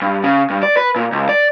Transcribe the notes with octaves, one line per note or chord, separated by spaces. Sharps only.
G2
C#3
G2
D5
B4
A#2
C#2
D5